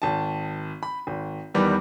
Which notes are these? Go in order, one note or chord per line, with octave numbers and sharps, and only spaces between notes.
G#1 A5
B5
G#1
E2 D#3 G3 B4 D6